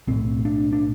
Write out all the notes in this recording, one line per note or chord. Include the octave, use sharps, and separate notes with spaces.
B1 A2 C4
D4
D4